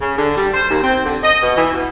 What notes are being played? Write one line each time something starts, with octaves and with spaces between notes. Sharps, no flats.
C#3
D3
G3
C5
D#2
C4
D3
D#5
B2
E3
B2